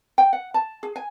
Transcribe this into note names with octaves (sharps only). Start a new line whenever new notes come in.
G5
F#5
A5
G#4
G#5